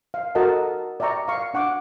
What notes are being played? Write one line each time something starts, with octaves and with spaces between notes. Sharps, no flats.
F5
F#4 A4 A#4 D#5 F#5 A5
D5 E5 G5 A#5 C#6
F5 C#6
D4 F#5 C#6 D6